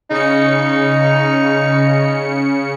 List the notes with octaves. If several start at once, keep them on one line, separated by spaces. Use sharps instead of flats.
C#3 D#4 C#7